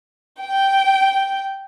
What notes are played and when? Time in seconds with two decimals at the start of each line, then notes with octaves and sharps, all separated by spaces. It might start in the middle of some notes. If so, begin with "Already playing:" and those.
0.41 G5